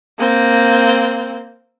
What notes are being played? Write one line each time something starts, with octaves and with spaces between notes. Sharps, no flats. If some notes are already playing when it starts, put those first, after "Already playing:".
A#3 C4